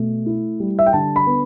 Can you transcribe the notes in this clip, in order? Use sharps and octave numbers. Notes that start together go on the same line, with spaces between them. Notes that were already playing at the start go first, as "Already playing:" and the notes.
Already playing: B2 A3
E4
G3
E5
G5
D3 A5
B5
B3